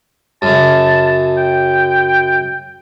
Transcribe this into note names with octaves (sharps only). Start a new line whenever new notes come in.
F#2 C#3 A5
G5